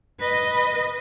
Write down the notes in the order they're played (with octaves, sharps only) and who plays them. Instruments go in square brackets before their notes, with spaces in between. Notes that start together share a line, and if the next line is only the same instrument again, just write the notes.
[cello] B4 D#5